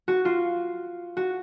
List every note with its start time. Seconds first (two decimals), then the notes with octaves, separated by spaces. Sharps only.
0.08 F#4
0.25 F4
1.17 F#4